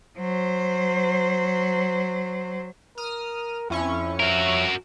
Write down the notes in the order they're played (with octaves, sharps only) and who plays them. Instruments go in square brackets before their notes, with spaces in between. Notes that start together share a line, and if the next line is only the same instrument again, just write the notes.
[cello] F#3 C5
[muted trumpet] A#4 [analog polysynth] D#6 F6
[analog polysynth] F2 C#4 C#6 [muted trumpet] E4
[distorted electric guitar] F#4 A#4 [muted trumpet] E5